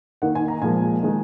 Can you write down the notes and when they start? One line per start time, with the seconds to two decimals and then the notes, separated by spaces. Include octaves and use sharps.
0.22 D#3 A#3 D#4 F#5
0.35 G#5
0.48 A#5
0.62 A#2 F3 G#3 G#5
1.03 D#3 G#3 D#4